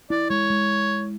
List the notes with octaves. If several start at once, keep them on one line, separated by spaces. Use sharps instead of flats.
E4 D5
G#3 C#5
G#3